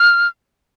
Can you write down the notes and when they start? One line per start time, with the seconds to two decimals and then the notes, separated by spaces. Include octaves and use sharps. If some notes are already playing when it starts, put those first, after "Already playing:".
Already playing: F6